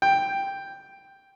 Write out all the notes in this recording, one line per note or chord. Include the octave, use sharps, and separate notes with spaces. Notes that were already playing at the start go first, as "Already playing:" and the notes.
G5